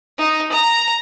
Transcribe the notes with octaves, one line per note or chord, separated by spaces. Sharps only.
D#4
A#5